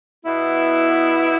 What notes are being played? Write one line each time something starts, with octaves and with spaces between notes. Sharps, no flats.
B2 B3 E4